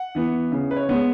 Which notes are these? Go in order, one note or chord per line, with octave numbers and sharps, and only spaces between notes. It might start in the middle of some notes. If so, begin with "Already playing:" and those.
Already playing: F#5
E3 B3
C#3
B4
C#5
G#3 B3